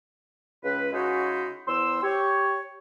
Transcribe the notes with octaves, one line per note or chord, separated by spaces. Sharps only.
C#2 B4
C#3 G#3 C#4 D#4 E4 F#4
E2 C5 C6 E6
G4 C#5